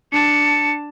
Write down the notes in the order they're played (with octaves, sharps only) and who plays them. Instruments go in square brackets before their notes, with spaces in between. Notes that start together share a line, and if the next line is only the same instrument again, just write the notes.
[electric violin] D4 A5 [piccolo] C#7